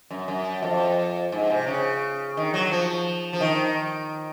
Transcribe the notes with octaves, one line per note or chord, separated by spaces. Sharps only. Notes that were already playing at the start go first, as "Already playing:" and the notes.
F#2
F#2
F2
G#2
C3
C#3
D#3
F#3
F3
F3
D#3